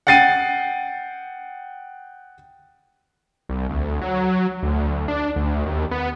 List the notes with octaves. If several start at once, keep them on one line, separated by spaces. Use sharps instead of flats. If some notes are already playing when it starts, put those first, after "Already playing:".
F#5 G5 A6 C7 D#7
C2
D2
F#3
D2
D4
D2
D#2
B3